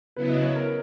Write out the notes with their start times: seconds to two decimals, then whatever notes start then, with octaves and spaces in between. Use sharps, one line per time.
0.16 C#3 F#3 B3 E4 B4
0.29 D#5
0.42 C#5
0.56 A#4